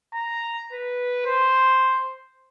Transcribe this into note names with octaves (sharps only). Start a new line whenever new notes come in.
A#5
B4
C5